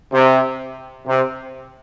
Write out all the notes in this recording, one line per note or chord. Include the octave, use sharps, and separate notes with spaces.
C3
C3